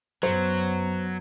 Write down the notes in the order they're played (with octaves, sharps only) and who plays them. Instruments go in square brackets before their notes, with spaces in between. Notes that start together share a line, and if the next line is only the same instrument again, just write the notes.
[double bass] F#2 B3 [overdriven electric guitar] F#3 [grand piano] C5